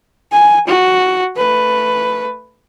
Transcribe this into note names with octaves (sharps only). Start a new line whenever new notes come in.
G#5
F#4
A3 B4